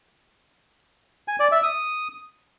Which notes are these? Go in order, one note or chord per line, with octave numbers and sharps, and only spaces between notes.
G#5
D5
E5
D#6